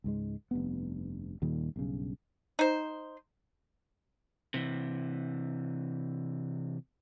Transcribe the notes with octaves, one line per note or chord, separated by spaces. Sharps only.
C#2 G#2 G#3
F1 G2 B3
D#2 A#2 D#3 G3
B1 G2 C#3
D#4 C5
C3 E3